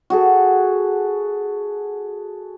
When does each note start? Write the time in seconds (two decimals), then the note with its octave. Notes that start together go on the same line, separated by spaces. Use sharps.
0.10 F#4 G#4 A4